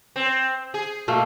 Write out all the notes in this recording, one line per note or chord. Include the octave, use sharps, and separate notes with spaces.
C4
G#4
B2 A3 A#3